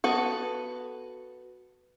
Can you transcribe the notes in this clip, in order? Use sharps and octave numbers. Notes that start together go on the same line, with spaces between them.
B3 F#4 A4